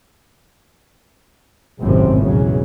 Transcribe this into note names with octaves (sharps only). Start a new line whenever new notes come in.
G#1 C#2 F#2 A2 C3 C4
B1 E2 C#3 F#3